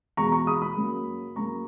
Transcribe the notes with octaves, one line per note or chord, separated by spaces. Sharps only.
E2 B2 G#3 A#5 C#6
A#5 C#6
B5 D#6
B5 D#6
F#2 C#3 F#3 A#3
F#2 C#3 F#3 A#3 A#5 C#6